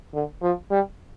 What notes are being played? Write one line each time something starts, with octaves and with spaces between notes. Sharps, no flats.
D3
F3
G3